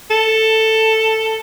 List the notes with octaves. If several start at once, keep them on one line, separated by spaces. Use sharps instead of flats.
A4